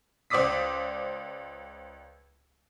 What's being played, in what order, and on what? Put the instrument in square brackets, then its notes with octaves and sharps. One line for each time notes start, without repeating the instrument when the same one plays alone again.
[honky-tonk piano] C#2 C5 D5 D6 D#6 B6